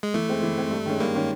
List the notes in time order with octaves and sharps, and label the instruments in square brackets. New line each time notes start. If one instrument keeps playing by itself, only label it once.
[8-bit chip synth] G#3
[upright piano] E3 [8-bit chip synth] A3
[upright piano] G#3 C4
E3
G#3 C4
G2
D#3 G#3 C#4
[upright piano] G2 [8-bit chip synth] A#3
[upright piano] D#3 G#3 C#4